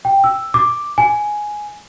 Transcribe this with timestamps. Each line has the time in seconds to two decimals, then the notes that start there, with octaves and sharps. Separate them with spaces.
0.05 G5
0.24 E6
0.54 D6
0.98 G#5